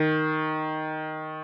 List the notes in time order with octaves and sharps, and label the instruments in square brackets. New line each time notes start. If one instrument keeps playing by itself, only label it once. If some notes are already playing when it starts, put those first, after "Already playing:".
Already playing: [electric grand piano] D#3